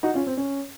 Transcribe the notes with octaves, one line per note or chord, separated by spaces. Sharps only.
D#4 F#4
C#4 F4
C4
C#4